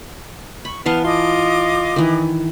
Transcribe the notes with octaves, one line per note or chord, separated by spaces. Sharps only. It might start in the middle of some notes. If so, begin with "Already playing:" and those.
B5 C#6
E3 B3 F5 A5 F6
F4 D#5 D6 D#6
D#3 E3